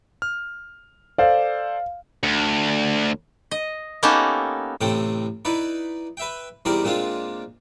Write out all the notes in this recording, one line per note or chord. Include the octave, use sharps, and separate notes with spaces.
F6
A4 C5 D5 F5
D2
D#5
A#3 B3 C#4 D#4 G4 A4
A1 A2 C3 C4 A4 G5
D#4 E4 B4 D5
B4 E5 G5
E2 G3 C4 D#4 A#4 D5
A#2 G#3 C4 D4 F4